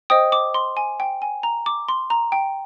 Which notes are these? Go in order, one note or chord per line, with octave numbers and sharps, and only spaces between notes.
C5 D#5 G5 D#6
D6
C6
G#5
G5
G#5
A#5
D6
C6
A#5
G5